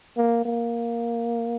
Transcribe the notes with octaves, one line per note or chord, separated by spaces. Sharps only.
A#3
A#3